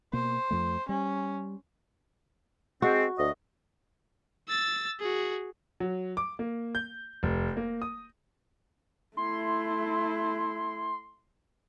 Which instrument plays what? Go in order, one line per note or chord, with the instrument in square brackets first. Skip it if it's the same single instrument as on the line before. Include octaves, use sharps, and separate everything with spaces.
[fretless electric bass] B2 A#3 [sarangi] C5
[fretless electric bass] F2 F3 A3
[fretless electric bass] G3 [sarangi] C#4
[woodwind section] G#3 C4 [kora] F#4
[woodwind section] D2 D#5
[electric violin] E6 A6
F#4 G#4
[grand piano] F#3
D6
A#3
G6
F1
A#3
D#6
[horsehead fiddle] A3 E4 [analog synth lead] C6